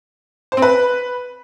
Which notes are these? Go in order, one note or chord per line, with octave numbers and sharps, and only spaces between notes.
C5
C4
B4